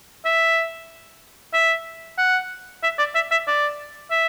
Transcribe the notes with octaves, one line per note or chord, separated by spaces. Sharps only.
E5
E5
F#5
E5
D5
E5
E5
D5
E5